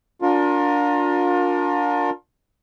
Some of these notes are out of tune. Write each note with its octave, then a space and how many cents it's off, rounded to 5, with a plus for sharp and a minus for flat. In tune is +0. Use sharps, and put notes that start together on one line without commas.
D4 -15 F4 +35 A#4 +0